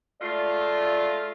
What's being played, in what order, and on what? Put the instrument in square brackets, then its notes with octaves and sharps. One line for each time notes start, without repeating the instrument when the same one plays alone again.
[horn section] G#3 A3 F4 [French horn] D5